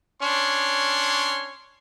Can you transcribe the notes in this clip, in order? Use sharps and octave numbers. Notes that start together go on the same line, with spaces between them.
C#4 D4 C#5 C6